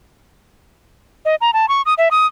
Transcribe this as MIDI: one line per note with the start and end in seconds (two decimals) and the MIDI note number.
1.25 1.35 75
1.41 1.51 82
1.53 1.68 81
1.68 1.82 85
1.86 1.94 87
1.98 2.09 76
2.11 2.26 87